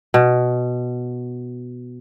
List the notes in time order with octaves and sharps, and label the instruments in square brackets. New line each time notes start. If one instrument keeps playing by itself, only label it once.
[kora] B2